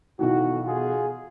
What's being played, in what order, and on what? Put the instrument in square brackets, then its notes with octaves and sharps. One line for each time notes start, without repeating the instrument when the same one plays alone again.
[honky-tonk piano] B1 D#3 E3 [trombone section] F#4
[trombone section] F4 F#4 G#4